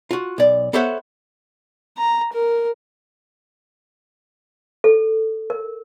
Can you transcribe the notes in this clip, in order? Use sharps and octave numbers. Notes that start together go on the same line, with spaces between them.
F4 F#4
B1 D5
B3 A4 C5 C#5 E5 F#5
A#5
A#4
A4
A#4